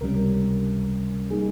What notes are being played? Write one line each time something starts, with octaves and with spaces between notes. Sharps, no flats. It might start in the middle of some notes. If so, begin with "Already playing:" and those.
C#2 C3 G3 C#4 A#4
G3 A#3 D#4 G#4